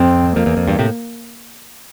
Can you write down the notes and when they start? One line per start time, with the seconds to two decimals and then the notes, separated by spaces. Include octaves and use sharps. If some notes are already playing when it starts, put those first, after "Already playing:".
Already playing: F2 C4
0.36 F2 A#3
0.46 E2
0.57 F2
0.67 E2 G2
0.79 A2 C3